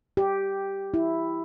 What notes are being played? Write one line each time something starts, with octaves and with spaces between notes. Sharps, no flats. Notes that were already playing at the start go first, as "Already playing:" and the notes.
G4
E4